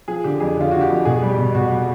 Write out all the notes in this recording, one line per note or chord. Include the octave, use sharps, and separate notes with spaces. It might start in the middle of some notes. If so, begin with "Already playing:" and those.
F3 G#4
D3 G4
F2 G#4
D3 F4
D3 F#4
G4
F2
B2 G#4
G3
G4
B2
B2 F#4
G3